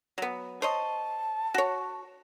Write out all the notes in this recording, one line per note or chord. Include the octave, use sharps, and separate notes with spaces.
F#3 B3
C5 C#5 D#5 A5
F#4 C#5